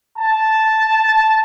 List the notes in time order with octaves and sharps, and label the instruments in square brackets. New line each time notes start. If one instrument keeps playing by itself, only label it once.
[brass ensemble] A5